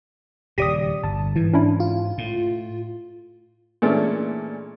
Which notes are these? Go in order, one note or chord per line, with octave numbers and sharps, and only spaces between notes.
D#1 C#3 G4 D5 D#6 A#6 B6 D#7
G1 A5
G#2 E3
C#4 D4 E4
F4
A2
A#2 E3 G#3 A3 C#4 D4